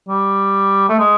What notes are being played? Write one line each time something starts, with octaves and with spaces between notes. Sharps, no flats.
G3
A3
G#3